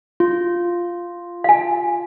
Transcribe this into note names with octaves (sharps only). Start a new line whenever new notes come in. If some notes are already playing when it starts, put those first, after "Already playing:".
F4
F5 G#5